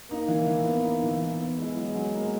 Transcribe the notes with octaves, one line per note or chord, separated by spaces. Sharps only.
A#3 D#4
E3
E3
B3
D#4
E3
E3
B3
G#3 E4
F#3
F#3
A#3